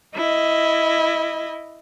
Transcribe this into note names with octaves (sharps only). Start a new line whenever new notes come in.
E4 D#5